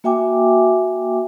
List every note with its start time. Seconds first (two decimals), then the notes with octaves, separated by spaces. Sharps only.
0.04 A#3 F#4 E5 G5 G#5 D6